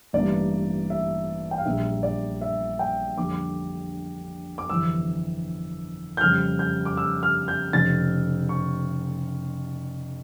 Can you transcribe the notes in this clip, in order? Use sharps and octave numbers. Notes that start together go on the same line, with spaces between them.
A1 G2 E3 A#3 D5
E5
G5
F5
A#1 A#2 G3 A#3 E5
D5
E5
G5
F2 D3 G3 A#3 D6
D6
G1 F2 E3 E6
G6
F2 C#3 G3 F6
G6
D6
E6
F6
G6
F1 F2 C#3 A6
C#6